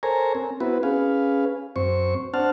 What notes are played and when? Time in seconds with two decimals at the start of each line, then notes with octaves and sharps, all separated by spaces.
0.03 A4 A#4 C5 C#5 G#5 A#5
0.35 C4
0.60 B3 C4 E4 F#4 B4
0.83 C#4 G#4 B4 F5
1.76 F#2 C4 C5 C#6
2.34 C4 D4 C5 F#5 A5 F6